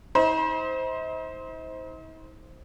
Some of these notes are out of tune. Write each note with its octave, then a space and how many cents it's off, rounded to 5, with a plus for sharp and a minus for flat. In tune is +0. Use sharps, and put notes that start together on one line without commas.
D#4 +45 C5 +0 B5 -45